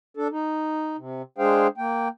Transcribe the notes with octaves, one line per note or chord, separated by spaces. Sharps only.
D4 A4
D#4
C3
G#3 D4 G#4 C5 F5 G5
A#3 G5